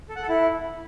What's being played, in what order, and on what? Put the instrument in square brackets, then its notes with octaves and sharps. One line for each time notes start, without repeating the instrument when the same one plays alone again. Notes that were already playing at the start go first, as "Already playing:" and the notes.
[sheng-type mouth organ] A4
F#5
A4
E4